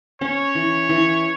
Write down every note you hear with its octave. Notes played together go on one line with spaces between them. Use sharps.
C#4 C#5
E3
E3